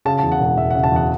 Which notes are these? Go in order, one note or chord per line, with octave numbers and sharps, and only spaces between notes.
C#3 A5
A5
E2
F#5
E1
E1 E5
F#5
C#3
A5
E2 F#5